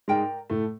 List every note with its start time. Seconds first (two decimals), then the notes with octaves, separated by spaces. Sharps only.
0.08 G#2 G#3 A#4 D5 G5 A#5
0.50 A2 A3